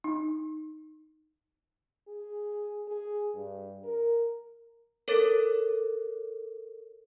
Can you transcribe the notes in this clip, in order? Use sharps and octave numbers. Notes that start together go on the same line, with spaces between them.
D#4
G#4
G#4
G2
A#4
A4 A#4 C#5 D6 A6